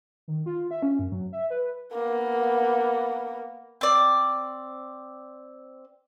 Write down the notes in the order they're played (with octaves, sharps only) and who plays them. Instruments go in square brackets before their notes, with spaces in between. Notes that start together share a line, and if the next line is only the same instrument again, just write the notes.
[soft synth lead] D#3
F4
E5
C#4
F#2
F#3
E5
B4
[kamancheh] A#3 B3
[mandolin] C4 D5